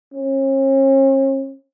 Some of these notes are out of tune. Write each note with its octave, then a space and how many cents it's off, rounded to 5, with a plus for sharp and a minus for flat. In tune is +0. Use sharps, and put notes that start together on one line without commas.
C#4 -45